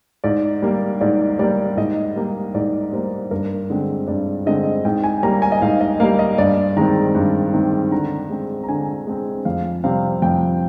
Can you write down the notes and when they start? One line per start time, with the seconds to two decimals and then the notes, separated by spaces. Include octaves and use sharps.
0.24 G#2 D5
0.62 G3 A#3
1.01 G#2 D5
1.39 G3 A#3 D5
1.77 G#2 D#5
2.16 G3 A#3
2.54 G#2 D5
2.93 G3 A#3 C5
3.31 G2 A#4
3.70 D3 G#3 C4
4.08 G2 D5
4.46 D3 G#3 C4 D#5
4.85 G#2 G5
5.04 G#5
5.23 G3 A#3 A#5
5.42 G#5
5.52 D#5
5.62 G#2 F5
5.81 D#5
6.00 G3 A#3 F5
6.19 D#5
6.38 G2 D5
6.77 D#3 G#3 C4 A#5
7.15 G2
7.54 D#3 G#3 C4
7.92 D3 A#5
8.30 G#3 C4
8.64 A#5
8.68 D3 G#5
9.07 G#3 C4
9.45 F2 F5
9.84 C3 G3 C4 F5
10.22 F2 G5